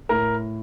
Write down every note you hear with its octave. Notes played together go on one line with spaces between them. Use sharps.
A2 A#4